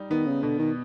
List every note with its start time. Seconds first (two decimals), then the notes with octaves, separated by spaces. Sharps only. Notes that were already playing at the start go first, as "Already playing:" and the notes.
Already playing: G3 D#4
0.10 D#3 B3
0.27 C#3
0.43 B2 D3
0.59 D#3